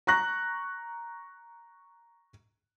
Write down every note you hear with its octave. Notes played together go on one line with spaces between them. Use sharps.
A#5 C#6 F#6 A#6